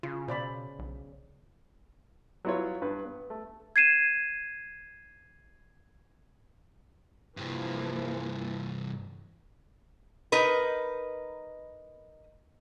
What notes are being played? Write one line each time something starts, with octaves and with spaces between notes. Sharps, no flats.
C#3 F4
B2 C5 D5 B5
B1
F#3 B3 E4 F4 C#5
G2 B4
B3
A3
G#6 C7 D#7 E7
G2 C3 E3 F3 A#3
D#4 A#4 B4